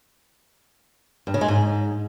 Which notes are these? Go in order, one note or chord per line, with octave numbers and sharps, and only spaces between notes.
G2
C#3
G#3
G#2